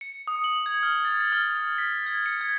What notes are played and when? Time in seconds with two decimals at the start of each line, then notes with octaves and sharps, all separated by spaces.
0.01 C#7
0.28 D#6
0.44 F#7
0.66 G#6
0.83 F6
1.05 A6
1.21 A6
1.32 F6
1.78 B6
2.06 G#6
2.26 C#7
2.41 G#6